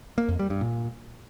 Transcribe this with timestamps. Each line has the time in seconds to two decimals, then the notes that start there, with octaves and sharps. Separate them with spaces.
0.18 A#3
0.29 F2
0.39 G3
0.50 G2
0.61 A#2